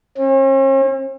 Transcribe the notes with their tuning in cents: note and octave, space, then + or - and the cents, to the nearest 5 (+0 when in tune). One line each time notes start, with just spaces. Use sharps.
C#4 -45